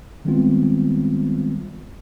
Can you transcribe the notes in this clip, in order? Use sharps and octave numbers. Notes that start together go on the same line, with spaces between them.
D#3 G3 G#3 B3 C4 F4